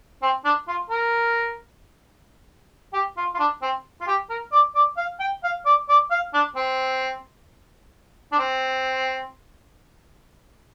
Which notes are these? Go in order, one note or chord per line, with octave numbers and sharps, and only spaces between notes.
C4
D4
F4
A#4
G4
F4
F4
D4
C4
F4
G4
A#4
D5
D5
F5
G5
F5
D5
D5
F5
D4
C4
D4
C4